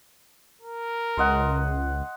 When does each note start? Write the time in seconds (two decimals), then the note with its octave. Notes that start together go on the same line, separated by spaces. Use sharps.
0.62 A#4
1.17 C#2 C5 D#5 F#5